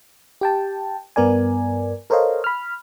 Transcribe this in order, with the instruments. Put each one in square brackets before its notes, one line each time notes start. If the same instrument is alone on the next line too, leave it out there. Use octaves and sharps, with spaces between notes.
[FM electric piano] G4 G5 A5
G2 B3 A#4 D5 G#5
A4 A#4 C5 C#5 D#5 F5
B5 F6